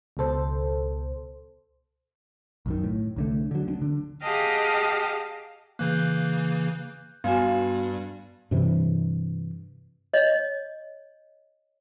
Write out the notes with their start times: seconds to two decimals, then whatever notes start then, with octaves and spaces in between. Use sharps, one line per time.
0.17 C#2 B2 A4 C5
2.66 B1 F#2 D#3
2.84 A2
3.16 C2 D3 A3
3.51 D3 F#3
3.66 D2 C4 D4
3.82 D3
4.22 G4 G#4 D#5 F5 F#5 A5
5.79 C#3 E3 A#3 F#6 G6
7.24 G2 G3 B3 F#4 F5 G#5
8.51 G2 C3 E3
10.13 C#5 D#5